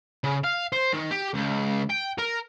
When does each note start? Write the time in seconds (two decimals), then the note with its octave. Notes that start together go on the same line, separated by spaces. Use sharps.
0.24 C#3
0.44 F5
0.72 C5
0.93 D#3
1.11 G4
1.34 C#2
1.90 G5
2.18 A#4